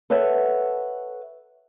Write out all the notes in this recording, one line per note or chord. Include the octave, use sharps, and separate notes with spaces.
A4 B4 C#5 E5 F#5